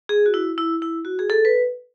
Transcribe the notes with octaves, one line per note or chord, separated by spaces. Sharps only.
G#4
F#4
E4
E4
E4
F#4
G#4
A4
B4